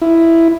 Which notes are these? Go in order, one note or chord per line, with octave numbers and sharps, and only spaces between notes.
E4